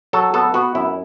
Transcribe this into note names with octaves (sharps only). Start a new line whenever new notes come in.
F#3 A4
B3 A4
B3 F#4
F#2 E4